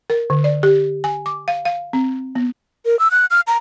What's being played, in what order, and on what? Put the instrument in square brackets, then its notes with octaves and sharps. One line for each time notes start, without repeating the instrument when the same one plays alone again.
[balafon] A#4
D3
D5
G4
G#5
D6
F5
F5
C4
B3
[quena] A#4
E6
F#6
F6
A#5